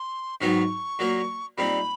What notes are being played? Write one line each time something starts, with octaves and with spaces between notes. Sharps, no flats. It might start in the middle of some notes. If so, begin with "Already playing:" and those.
Already playing: C6
G#2 D#3 F#3 B3 D#4 C#6
A#2 F#3 A#3
A#2 G3 C4 D#4 B5